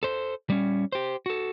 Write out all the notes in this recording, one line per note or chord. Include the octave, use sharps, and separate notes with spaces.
A4 C5
G3 C#4
G4 C5
F#4 A4